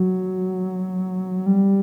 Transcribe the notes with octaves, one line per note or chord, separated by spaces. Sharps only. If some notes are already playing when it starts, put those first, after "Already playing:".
Already playing: F#3
G3